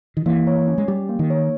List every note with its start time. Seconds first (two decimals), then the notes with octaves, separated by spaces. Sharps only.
0.17 D#3
0.26 E3 A#3
0.47 C#5
0.68 C#4
0.78 G#3
0.88 G3 G4
1.09 A#3
1.19 D#3
1.30 C#5